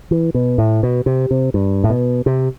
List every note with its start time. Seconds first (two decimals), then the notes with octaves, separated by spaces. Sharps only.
0.11 E3
0.34 B2
0.58 A2
0.83 B2
1.06 C3
1.31 C3
1.54 G2
1.84 A2
1.90 B2
2.26 C3